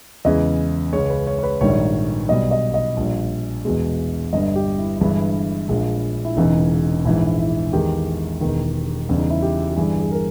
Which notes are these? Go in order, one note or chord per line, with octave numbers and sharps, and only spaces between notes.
E2 C#3 E3 G#3 D#5
C#2 C#3 G#3 C#5
B4
C#5
C#5
B4
A#1 G#2 D#3 G3 C#5
B1 B2 G3 D#5
D#5
D#5
A#1 A#2 G3
E2 B2 G#3
G1 G2 G3 D#5
G4
E4
G1 G2 E3 G#3 E4
A#1 A#2 G#3
E4
E1 E2 C#3 E3 D#4
A#1 G#2 E3 E4
E4
E2 D#3 G#3 G4
E1 E2 D#3
E2 C#3 G3
D#4
E4
G4
G4
G1 G2 E3 G3 G#4
G#4
A#4